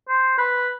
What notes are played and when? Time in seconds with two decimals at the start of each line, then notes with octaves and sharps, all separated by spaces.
0.09 C5
0.38 B4